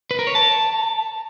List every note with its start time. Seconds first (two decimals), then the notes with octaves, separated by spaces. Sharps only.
0.11 B4
0.19 A#4
0.27 C#5
0.35 A5